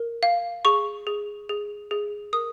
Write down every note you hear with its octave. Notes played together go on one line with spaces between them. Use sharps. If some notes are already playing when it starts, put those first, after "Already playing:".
Already playing: A#4
F5
G#4 C#6
G#4
G#4
G#4
A#4 D#6